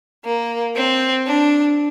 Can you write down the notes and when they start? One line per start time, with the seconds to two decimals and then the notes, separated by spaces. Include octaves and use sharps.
0.25 A#3
0.76 C4
1.26 D4